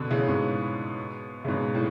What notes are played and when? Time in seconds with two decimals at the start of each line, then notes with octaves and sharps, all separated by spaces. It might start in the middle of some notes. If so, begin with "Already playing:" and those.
Already playing: B2 D3
0.10 A2 C#3
0.27 G#2 B2
1.44 C#3
1.48 G#2 B2
1.75 A2